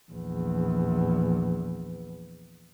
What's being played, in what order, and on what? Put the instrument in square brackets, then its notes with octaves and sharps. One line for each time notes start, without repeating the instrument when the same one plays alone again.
[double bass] A#1 E2